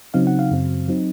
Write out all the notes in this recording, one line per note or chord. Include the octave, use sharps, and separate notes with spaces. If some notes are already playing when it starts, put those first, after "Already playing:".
C#3 F#3 C4 D#4 F5
F#5
F5
F#2 C#3 F#3 C4
F#3 C4 D#4